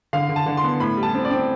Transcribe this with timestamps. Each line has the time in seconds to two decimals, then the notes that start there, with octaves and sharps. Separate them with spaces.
0.13 D3 F5
0.29 D3
0.36 A5
0.46 D3
0.57 C6
0.64 B3
0.80 A2 B5
0.97 G3
1.03 A5
1.15 C4
1.25 D5
1.31 C4